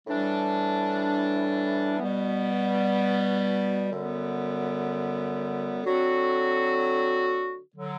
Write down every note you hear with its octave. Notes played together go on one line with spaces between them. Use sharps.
A2 E3 G3 D4
B2 G3 B3
F#2 D3 G3 B3
D3 F#3 C4 F#4 A4
D3 F#3